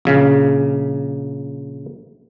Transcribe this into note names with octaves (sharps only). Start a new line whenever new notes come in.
A#1 C#3